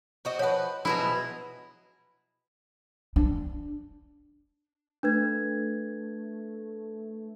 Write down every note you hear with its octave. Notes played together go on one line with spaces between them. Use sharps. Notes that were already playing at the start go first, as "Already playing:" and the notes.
C4 F#4 D#5
F3 B4 C#5 F#5
B2 F3 F#3 E4 G#4
D4
A3 D4 B4 G#6